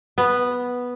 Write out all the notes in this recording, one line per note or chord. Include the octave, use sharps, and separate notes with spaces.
B3